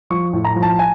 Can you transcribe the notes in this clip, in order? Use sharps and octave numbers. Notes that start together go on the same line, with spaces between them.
F3 C#6
A2
A#5
F3
A5
G#5